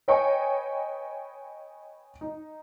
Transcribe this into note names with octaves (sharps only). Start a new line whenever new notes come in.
B4 C#5 D#5 G5 G#5 C#6
D#4